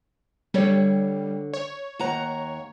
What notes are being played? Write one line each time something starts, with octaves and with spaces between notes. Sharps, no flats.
D3 G3 C#5
C#5
D#2 F#5 A#5